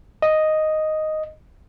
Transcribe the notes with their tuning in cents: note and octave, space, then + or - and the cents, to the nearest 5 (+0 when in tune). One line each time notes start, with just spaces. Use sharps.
D#5 +0